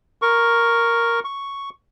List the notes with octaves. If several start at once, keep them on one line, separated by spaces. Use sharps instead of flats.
A#4 C#6
C#6